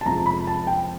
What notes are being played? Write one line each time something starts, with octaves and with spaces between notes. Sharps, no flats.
A5
F2 C3 F3 G#3 A#5
B5
A5
G5